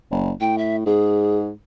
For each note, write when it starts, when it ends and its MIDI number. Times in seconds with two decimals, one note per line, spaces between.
0.11 0.32 30
0.41 0.82 45
0.41 0.58 79
0.58 0.76 76
0.86 1.51 44
0.86 1.38 68